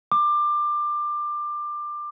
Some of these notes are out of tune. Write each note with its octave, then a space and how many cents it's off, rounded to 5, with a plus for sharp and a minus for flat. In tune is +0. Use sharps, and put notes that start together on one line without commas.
D6 +20